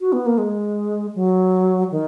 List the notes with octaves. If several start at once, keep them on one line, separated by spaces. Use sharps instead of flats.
F#4
B3
A#3
G#3
F#3
D#3